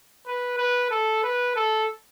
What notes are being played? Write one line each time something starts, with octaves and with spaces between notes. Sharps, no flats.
B4
B4
A4
B4
A4